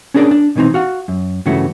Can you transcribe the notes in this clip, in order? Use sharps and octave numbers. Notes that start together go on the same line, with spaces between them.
C#4 D4 G#4 A#4 D5
D4
B2 D#3 E3 C4 D#4
F#4 F5 F#5
F#2
G2 C#3 E3 A3 F#4